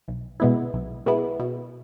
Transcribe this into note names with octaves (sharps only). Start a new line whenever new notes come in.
B1
B2 G#3 B3 E4
B1
B2 G#3 B3 E4
B2